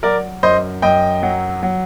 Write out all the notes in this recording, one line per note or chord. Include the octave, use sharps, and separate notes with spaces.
F#3 A#4 D5
F#2 C5 D#5
F#2 D#5 G5
F#3
F#3